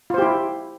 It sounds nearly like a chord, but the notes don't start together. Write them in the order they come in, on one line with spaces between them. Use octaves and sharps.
F4 C5 G4 E4